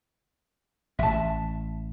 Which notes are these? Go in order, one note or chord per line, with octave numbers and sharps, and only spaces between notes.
A1 E5 A5